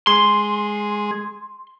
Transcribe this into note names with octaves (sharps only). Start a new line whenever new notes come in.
G#3 G#4 C6